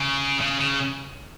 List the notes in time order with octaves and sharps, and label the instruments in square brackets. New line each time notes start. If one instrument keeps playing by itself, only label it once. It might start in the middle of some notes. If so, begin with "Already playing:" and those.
Already playing: [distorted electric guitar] C#3
C#3
C#3